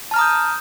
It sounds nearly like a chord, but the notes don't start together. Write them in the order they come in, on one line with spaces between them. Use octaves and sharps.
A5 F6 A#5 D#6 G6